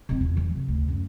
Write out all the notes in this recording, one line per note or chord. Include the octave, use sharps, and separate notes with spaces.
B2 C4
E2 F4
E3
C3
D2
F#2